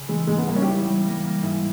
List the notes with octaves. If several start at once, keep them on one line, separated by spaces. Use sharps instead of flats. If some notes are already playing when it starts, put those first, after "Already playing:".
Already playing: C#3
E3 G#3
G#2 G#3
B3
G3 A#3
C#4
G4
B3 E4
G3
A#3
A#3
G#2 E4